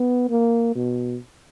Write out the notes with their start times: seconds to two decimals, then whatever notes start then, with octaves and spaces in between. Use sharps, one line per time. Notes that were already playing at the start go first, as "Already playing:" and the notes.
Already playing: B3
0.30 A#3
0.76 B2